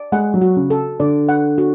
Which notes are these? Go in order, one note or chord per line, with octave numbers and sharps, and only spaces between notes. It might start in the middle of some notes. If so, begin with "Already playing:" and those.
Already playing: D5
G#3 F#5
F#3
F#4
C#3
A4
D3 D5
F#5
F#4